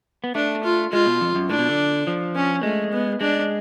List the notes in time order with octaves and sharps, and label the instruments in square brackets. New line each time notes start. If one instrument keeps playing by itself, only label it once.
[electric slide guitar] B3
[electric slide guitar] A3 [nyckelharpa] D4
[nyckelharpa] F4
[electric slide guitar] G#3 [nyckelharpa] F4
[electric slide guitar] B2
F2
F#2
[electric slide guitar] A2 [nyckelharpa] D4
[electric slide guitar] B2
D3
F3
[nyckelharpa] C#4
[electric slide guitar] G#3 [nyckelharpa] A3
[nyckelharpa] B3
[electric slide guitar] G#3 [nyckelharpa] D4